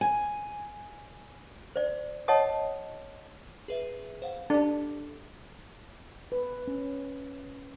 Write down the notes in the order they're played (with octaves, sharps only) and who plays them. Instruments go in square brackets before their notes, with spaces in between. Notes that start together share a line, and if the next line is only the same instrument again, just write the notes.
[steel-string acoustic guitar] G#5
[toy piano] C5 D5
C#5 D#5 F#5 A5 D#6
[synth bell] G#4 B4 E5
C5 F5 F#5
[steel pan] D4 [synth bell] G4 A4
[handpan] B4
C#4